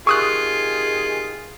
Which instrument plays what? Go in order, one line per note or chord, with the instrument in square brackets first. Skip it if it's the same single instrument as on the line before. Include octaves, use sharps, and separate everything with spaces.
[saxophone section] C3 D#3 G#4 [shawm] F4 [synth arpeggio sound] C#6 D#6 F#6